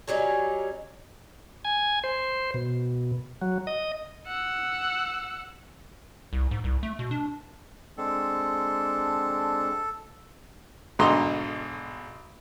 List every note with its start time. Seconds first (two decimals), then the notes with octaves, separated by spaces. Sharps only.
0.08 F#3 G3 C#4 D#4
1.65 G#5
2.04 C5
2.54 B2
3.42 F#3
3.67 D#5
4.27 F#5 E6
6.33 C2
6.51 G#2
6.64 C2
6.83 A3
6.99 B2
7.11 D4
7.98 G#3 C4 D4 A4
10.99 B1 G#2 D3 D#5 A#5 C6